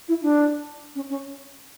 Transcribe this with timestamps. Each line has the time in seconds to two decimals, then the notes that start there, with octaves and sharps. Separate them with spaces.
0.08 E4
0.23 D4
0.95 C#4
1.10 C#4